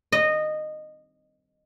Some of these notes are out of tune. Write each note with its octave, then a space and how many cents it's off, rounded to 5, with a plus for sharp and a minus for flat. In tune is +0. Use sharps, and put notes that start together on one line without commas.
D#5 -15